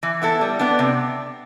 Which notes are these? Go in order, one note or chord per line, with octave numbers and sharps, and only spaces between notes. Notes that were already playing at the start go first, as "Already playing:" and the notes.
E3
B3 E4 A4
G3
B3 D4
C3